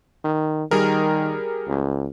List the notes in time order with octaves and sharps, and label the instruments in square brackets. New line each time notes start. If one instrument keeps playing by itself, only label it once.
[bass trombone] D#3
[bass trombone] D#3 [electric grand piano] G3 G#4 A#4
[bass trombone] C#2